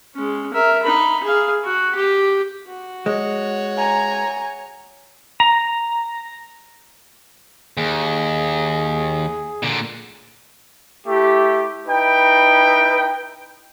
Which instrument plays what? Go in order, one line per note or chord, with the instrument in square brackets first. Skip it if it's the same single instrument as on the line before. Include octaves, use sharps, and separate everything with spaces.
[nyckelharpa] G#3 C#4
A#4 E5
D#4 B5
G#4 F5
F#4
G4
F#4
[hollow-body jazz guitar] G#3 [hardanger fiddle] C#5
[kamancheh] G#5 A#5
[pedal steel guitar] A#5
[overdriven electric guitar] D#2 [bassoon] G#4
[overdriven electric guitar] A#2 D3
[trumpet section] A3 E4 G4
D#4 E4 B4 G5